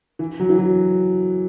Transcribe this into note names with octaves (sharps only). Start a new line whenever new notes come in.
E3
F#3
E3
F#3